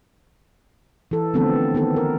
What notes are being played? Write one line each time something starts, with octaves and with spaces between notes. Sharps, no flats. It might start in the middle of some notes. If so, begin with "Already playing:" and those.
E3 A4
D3 F3 A3 B3 C4 A4
D#3 B3 A4
A#4